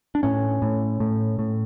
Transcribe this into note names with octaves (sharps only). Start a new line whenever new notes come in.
D4
A2 C#4
A2
A2
A2